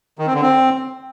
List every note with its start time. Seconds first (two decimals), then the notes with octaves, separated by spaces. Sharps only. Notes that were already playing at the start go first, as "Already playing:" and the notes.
0.19 D#3
0.27 C4
0.34 D3
0.42 C4